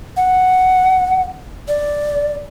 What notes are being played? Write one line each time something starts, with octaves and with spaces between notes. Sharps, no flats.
F#5
D5